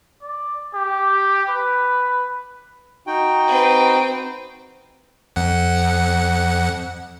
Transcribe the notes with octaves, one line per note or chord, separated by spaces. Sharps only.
D5
G4
B4
D#4 F#4 G5
C4 B4
F2 F#5